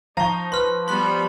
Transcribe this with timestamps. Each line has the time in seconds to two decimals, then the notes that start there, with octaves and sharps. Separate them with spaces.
0.17 F3 D#4 F5 A5 A#5 C#6 A#6
0.52 B4 C6 F6
0.88 G3 B3 B5 C6 F#6